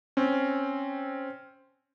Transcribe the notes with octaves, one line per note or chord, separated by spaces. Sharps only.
C4 C#4